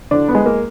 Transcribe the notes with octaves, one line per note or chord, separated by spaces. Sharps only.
D3 D4
B3
G#3
A#3